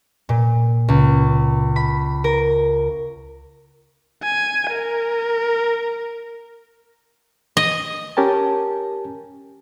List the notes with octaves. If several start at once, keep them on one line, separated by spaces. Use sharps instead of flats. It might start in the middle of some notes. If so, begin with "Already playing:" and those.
A#2
C#2
B5
A#4
G#5
A#4
D#5
C#4 G4 A#4 G#5 A5